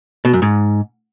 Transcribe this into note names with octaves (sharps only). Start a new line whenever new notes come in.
B2
F#2
G#2